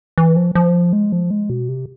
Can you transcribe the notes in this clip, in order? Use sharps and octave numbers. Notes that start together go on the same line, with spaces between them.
E3
F3
F3
G#3
F3
G#3
B2
C3